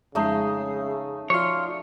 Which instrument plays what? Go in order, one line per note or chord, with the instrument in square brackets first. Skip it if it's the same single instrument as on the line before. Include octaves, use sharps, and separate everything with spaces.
[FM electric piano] F2 G#3 C7 [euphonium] C#3 [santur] A3 D#4
[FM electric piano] F3 F#4 D5 [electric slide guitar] F4 C#5